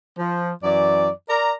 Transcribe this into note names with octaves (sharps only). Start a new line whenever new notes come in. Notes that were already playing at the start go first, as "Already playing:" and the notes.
F3
F#2 E3 D5
A#4 D5 A#5